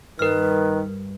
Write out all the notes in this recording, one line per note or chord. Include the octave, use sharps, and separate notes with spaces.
G2 D#3 A#4 B4 F6